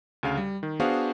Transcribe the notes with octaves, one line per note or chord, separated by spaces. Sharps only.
D2 C#3 F5
G3
D#3
B3 D4 F#4 G#4 C5 F5